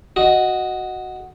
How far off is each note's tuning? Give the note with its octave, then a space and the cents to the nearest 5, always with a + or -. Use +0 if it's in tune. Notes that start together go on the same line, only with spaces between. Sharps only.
F#4 +0 D#5 +0